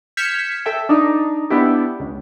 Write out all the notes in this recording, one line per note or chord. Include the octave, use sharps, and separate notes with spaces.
F6 G6 G#6 B6 C#7 E7
A4 E5 G5
D4 D#4
B3 D4 E4 G4
C#2